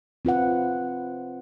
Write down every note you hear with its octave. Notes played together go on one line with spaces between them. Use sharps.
C4 F4 B4 F#5